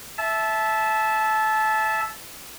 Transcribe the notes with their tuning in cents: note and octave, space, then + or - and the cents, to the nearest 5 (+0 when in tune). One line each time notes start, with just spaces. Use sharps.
E5 +0 A5 -20